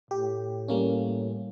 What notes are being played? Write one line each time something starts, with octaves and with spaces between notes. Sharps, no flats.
A2 G4
G3 A#3 C#4